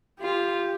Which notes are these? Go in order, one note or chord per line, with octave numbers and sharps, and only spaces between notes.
F4 G4